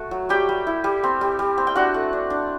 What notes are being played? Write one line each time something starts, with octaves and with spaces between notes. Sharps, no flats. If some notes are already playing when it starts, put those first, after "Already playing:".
Already playing: A3 F#4
F#3
G3 G4 G5
G3
E4
G3
C4
G3
G3
C4
G5
D4 F#4 F#5
A3
D4
D4